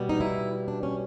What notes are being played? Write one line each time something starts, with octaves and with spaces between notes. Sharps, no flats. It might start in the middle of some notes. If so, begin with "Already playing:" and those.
Already playing: B2 G3
D#4
E4
D4
C#4